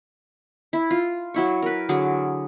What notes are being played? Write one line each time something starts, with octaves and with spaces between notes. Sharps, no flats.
E4
F4
F#3 E4 C#6
A#4 B4
D3 F#3 G#4 D6